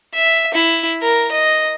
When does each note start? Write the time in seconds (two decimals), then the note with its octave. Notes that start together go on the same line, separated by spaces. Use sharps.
0.14 E5
0.54 E4
1.02 A#4
1.32 D#5